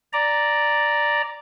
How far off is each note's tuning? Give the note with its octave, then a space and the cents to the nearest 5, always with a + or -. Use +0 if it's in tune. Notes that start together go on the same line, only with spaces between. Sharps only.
D5 +0 A#5 +0